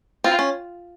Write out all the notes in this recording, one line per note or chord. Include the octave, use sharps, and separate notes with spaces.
C4 F4
C#4